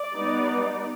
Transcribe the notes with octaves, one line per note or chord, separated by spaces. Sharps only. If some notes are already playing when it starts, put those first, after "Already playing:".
Already playing: D5
G3 B3 D#4